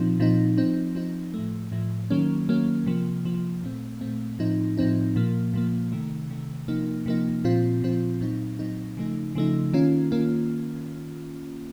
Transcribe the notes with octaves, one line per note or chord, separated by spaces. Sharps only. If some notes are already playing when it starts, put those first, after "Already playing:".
Already playing: A#2 F3 C4 D#4
A#2 F3 C4 D#4
F3 C4 D#4
F3 C4 D#4
A2 F3 A3
A2 F3 A3
D#3 F#3 A#3 C#4
D#3 F#3 A#3 C#4
C3 F3 A#3
C3 F3 A#3
A#2 A3 C4
A#2 A3 C4
A2 F3 C4 D#4
A2 F3 C4 D#4
A#2 F3 A#3
A#2 F3 A#3
C3 D#3 A3
C3 D#3 A3
C3 F3 A#3 D#4
C3 F3 A#3 D#4
A#2 F3 C4 F4
A#2 F3 C4 F4
A#2 F#3 C4 D#4
A#2 F#3 C4 D#4
C#3 F3 A3 D#4
C#3 F3 A3 D#4
D#3 A#3 C#4 F4
D#3 A#3 C#4 F4